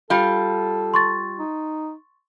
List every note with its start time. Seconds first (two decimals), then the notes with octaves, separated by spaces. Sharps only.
0.10 G3 F4 A4
0.94 C6 C#6 A6
1.39 D#4